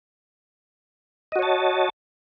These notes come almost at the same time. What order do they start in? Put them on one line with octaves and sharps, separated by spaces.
D#5 F#4 C#5 A5